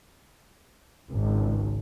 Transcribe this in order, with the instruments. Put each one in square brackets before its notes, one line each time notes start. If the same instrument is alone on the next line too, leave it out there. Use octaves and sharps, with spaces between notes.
[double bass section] G#1 C#2